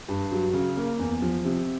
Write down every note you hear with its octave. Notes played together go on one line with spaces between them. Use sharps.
G2
F#3
C#3
A#3
E2
F3
C3